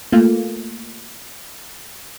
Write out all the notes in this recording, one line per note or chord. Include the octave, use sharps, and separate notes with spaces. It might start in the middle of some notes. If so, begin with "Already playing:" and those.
A3 A#3 F4